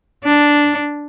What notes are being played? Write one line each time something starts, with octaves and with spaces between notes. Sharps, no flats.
D4